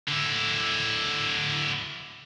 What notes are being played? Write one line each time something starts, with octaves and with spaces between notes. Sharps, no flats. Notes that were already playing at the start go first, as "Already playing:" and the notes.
D3 E4